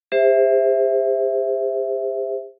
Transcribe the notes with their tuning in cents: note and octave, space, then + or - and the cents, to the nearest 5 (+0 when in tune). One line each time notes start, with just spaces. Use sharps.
G4 +45 C5 +0 E5 +0